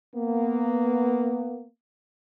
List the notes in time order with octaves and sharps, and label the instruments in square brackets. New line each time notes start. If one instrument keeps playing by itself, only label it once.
[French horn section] A#3 B3